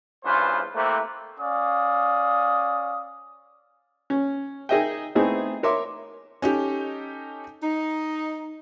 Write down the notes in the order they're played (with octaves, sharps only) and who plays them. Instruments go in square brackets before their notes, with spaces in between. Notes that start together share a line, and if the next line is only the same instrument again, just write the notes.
[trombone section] E2 G2 C#4 F4 B4 C5
C3 A3 A#3 E4 B4 C5
[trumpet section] C#4 D5 F5 D#6
[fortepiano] C#4
D#4 G#4 A#4 D#5 E5 G5
A3 B3 C4 D#4 E4 G#4
A#4 C#5 E5 C6 D6
[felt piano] C#4 D#4 G4 A4
[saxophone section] D#4